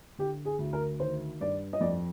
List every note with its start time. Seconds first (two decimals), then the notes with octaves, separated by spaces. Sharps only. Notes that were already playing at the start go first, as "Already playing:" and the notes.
0.18 D3 G4
0.45 G#4
0.59 D2
0.73 A#4
1.00 D#3 C5
1.40 G2 D5
1.73 D#5
1.81 F2 D5